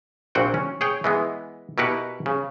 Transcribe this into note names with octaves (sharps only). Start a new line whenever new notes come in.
A#1 A#2 C4 F#4 F#5 G5
C#4
G#4 C#5 G5
E3 G#3 B3
B2 E4 G4 A#4 B4 F#5
C#3